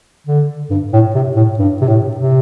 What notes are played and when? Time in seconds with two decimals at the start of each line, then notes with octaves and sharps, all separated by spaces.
0.27 D3
0.70 G2
0.93 A2
1.15 C3
1.36 A2
1.59 G2
1.81 C3
1.88 A2
2.17 C3